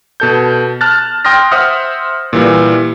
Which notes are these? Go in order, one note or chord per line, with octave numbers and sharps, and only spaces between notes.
B2 A4 G6
A5 F6 F#6 A6
G5 C6 D#6 F6 A#6
C5 E5 F#5 D#6 F6
A#2 E3 G3